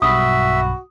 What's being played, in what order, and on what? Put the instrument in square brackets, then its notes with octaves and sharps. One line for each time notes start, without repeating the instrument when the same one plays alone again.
[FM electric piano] B1 G2 B5 [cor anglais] F#4 [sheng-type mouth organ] E5 [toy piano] D#6